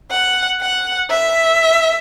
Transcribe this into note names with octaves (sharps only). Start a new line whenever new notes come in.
F#5
F#5
E5